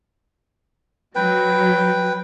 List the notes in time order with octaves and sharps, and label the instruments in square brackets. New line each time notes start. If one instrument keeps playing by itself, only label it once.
[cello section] F#3 [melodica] B4 G5